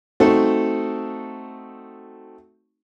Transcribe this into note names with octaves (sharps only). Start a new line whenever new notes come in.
A3 C4 D#4 F#4 A4